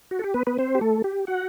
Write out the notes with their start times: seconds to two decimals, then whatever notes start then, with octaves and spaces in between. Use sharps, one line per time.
0.11 F#4
0.19 A4
0.24 G4
0.34 B3 B4
0.47 B3 B4
0.58 C4 C5
0.75 G4
0.81 A3 A4
1.04 G4
1.27 F#4 F#5